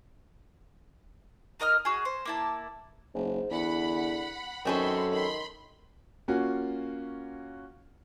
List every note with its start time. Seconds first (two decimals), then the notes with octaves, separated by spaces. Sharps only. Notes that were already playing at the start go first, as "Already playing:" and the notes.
1.60 D#4 A#4 D#5 F6
1.85 F#4 G#4
2.05 C5
2.25 A#3 E4 A5
3.14 F#1 G#2
3.51 E2 D3 F#5 B5
4.65 F#2 D#3 C4 C#4 A4 B5 C6
5.13 D#3 B5 C6
6.28 A#3 C#4 F4 F#4